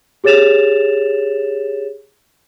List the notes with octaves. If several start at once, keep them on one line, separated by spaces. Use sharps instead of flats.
G4 G#4 C#5 A6 E7 F7